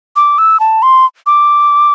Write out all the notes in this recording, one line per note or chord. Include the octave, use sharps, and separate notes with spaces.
D6
E6
A5
C6
D6